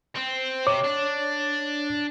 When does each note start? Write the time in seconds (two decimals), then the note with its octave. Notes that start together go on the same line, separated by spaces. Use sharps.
0.16 C4
0.67 C3 C#5 D6
0.84 D4